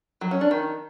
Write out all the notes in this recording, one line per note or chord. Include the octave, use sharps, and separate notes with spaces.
F#3
C#4
D4
D#3